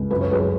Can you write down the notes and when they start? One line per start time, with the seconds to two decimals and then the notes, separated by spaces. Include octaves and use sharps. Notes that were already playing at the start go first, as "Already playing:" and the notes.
Already playing: C#2
0.10 F#2 B4
0.21 C#5
0.31 F#2 G#4 B4